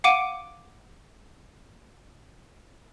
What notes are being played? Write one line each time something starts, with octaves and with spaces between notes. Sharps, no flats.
F5 F#5 D6 D7 D#7